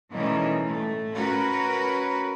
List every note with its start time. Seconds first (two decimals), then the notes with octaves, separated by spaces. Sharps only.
0.10 B2 D#3 E3 G3 A3 C#4
0.62 A2 A3
1.14 C#4 F#4 A#4 B4